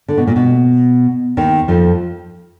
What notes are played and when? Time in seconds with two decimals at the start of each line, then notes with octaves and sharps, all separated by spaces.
0.08 D3
0.17 B2
0.27 A#2
0.36 B2
1.37 D#2 D#3
1.68 F2 F3